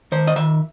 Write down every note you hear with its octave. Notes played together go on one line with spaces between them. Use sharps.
D#3 C5
D#5
D#3 E5